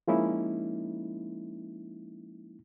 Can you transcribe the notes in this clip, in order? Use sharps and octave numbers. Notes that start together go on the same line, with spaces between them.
F3 G#3 A#3 C#4 D#4 E4